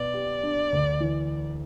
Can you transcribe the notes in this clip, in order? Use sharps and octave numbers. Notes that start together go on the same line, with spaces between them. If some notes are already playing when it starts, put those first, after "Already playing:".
Already playing: B2 B3 D5
G4
D4
D2
E3